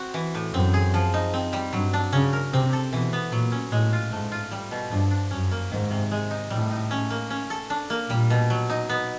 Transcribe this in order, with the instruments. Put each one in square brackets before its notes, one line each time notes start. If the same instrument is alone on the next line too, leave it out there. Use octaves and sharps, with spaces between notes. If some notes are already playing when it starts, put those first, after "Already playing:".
Already playing: [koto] C4 F#4
E3
A2
[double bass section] F#2 [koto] C4
[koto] G#4
F3
D#4
C4
G3
[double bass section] G2 [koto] F#3
[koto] D4
[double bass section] C#3 [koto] C#4
[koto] A#4
[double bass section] C3 [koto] C4
[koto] A4
[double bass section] B2 [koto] E3
[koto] B3
[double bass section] A#2 [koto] F#3
[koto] C#4
[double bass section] A2 [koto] G#3
[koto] F4
[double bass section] G#2 [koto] A3
[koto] F4
G3
B2
[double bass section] G2 [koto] F3
[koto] D4
[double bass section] F#2 [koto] C#4
[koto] A#3
[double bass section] G#2 [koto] D#3
[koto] C3
G#3
D#4
[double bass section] A2 [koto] G3
[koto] D#4
C#4
A#3
C#4
A4
D4
A#3
[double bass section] A#2 [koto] G3
[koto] B2
F#3
D#4
B3